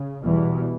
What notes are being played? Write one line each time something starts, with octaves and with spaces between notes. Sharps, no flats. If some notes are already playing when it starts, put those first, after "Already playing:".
Already playing: C#3
E2 B2 E3 G3